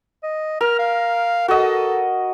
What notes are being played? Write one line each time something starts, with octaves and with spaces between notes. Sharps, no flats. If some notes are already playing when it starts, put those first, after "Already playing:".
D#5
A#4 F6
F5
F#4 A4 D#5